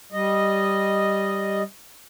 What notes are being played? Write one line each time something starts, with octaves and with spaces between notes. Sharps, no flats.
G3 D#5